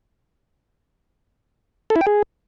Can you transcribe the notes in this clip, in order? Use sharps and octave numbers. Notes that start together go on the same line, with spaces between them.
A4
E4
G5
G#4